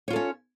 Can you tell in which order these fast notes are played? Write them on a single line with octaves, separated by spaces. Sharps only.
C#5 F4 A4 C#4